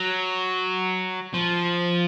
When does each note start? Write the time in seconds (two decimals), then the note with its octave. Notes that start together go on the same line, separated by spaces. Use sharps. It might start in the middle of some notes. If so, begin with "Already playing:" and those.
Already playing: F#3
1.34 F3